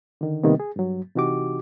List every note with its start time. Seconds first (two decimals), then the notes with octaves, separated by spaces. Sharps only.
0.21 D3 D#3
0.43 C3 D#3 G3 A#3 B3
0.60 G#4
0.76 G2 F#3
1.16 C3 E3 D#4 F#4 G4 D6